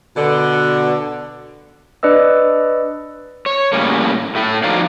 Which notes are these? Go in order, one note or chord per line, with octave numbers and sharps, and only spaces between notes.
B2 D3
D4 B4 D5 D#5 E6
C#5
A2 C#3 G3 A#3
A2 A3 E4
F3 D#4 F#4 D5 F5